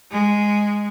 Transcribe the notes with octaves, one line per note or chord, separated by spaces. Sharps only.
G#3